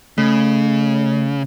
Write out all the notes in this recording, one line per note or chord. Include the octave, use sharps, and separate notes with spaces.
C#3 A3